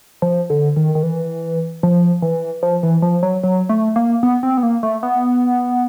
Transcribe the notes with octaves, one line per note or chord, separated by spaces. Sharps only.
F3
D3
D#3
D#3
E3
F3
E3
F3
E3
F3
F#3
F#3
A3
A#3
B3
C4
B3
A#3
A3
B3